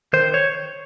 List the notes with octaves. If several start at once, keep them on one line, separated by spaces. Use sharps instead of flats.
D#3 C5
C#5